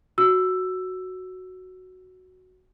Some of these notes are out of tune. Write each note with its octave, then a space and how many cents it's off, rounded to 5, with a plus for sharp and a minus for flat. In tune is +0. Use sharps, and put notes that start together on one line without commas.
F#4 +0 E6 +10